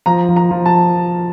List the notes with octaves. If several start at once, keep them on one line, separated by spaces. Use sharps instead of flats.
F3 A#5
F3
A#5
F3
A5